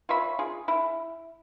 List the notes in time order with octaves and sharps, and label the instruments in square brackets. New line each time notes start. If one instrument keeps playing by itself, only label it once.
[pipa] F4 C#5 E5 B5
F4 G#4
E4